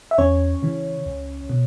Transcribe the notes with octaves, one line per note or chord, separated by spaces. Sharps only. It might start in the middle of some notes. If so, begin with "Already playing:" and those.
E5
E2 C#4 C#5
C#3 E3
C#2
B2